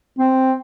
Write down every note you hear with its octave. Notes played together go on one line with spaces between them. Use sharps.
C4